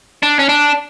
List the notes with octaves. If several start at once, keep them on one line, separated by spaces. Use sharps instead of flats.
D4
C#4
D4